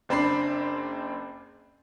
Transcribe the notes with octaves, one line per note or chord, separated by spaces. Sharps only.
F#1 C4 D4 B5 C7